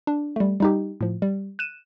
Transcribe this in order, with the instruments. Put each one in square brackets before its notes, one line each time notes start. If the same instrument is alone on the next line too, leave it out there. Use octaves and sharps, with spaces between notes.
[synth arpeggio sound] D4
G3 A3
G3 D#4 G4
A2 F3
G3
F#6 D#7 E7